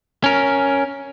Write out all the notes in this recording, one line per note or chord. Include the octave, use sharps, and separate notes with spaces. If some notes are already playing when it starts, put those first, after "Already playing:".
C#4 A#4